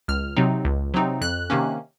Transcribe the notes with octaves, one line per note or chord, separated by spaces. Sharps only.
C#2 F6
C3 F#3 C4 D#4
C#2
C3 F#3 C4 D#4
F2 F#6
C3 D#3 A#3 C#4